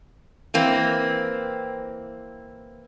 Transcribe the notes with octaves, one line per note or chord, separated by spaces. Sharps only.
E3 A#3 C4